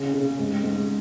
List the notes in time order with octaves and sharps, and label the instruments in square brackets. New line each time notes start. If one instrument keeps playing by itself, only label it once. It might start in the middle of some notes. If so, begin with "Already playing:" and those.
Already playing: [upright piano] C#3
C#3
G#2
G#2